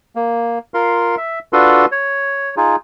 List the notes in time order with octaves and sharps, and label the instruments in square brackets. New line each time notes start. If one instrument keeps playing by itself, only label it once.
[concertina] A#3
F4 A#4 F5 C6
E5
D4 F4 F#4 A4 B4 C6
C#5
D#4 F4 G#4